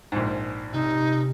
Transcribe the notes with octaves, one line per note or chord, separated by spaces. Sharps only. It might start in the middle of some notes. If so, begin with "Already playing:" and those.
A#1 G#2
C3 C4 D#4